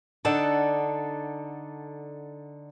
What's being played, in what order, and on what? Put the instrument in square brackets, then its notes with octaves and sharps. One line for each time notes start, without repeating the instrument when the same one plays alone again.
[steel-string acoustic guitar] D3 D4 D#4 A4 F#5 A5